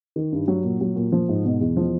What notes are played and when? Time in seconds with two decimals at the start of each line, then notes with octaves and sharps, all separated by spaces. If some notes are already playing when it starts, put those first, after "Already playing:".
0.16 D#3
0.32 G2
0.48 F#3
0.64 A#2
0.81 F#3
0.96 A#2
1.12 F3
1.29 G#2
1.45 B2
1.61 E2
1.77 F3